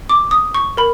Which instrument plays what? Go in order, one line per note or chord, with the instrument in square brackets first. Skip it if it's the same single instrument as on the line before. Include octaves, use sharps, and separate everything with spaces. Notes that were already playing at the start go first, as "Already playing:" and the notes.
[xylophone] D6
D#6
C#6
A#4 B5